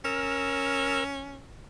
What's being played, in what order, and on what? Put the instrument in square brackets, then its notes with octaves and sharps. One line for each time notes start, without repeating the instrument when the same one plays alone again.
[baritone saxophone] C#4 [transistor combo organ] A#4 E6 F6